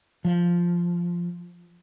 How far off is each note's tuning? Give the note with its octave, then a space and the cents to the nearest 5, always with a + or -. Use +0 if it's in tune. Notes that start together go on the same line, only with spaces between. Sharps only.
F3 -5